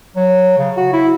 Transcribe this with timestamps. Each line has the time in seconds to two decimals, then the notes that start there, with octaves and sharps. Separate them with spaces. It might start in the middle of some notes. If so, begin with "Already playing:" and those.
0.16 F#3
0.58 C#3
0.77 F#4
0.93 E4